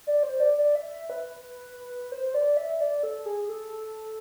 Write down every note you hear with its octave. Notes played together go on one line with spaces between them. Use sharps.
D5
C5
D5
D5
E5
B4
C5
C5
D5
E5
D5
A4
G#4
A4